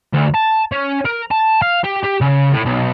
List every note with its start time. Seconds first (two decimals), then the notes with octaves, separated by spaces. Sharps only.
0.13 D2
0.34 A5
0.72 C#4
1.06 A#4
1.31 A5
1.62 F5
1.84 G4
2.03 G4
2.21 C#3
2.52 A2
2.65 B1